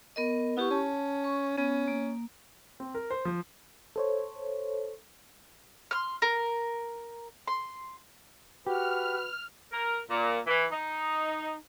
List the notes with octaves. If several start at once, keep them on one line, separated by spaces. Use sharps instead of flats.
B3 A#4 D#5
B3 E4 G4 C#6
C#4 A5
C#6
B3 C#4
A#3
C4
A#4
C5
F3
A4 C5 C#5
C6 F6
A#4
C6
F#4 G4 B4 F6
A#4
A#2
E3
D#4